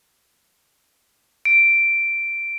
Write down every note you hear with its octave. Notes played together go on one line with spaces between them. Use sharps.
D7